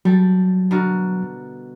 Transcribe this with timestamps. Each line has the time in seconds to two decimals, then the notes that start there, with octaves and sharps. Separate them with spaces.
0.05 F#3 G3 A4
0.71 B2 D3 A#4